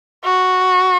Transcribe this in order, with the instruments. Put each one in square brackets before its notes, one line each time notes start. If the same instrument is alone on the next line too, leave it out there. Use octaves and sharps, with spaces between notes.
[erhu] F#4